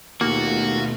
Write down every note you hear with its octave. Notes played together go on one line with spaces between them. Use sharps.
D#2 B2 A3 A#3 F4 F#4